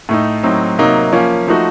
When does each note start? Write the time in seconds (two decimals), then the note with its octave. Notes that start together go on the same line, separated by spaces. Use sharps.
0.09 A2 A3 D#4
0.43 A2 F#3 C4 D#4
0.78 C3 F#3 A#3 D#4
1.13 F3 A#3 C#4
1.47 F3 A3 D#4 F#4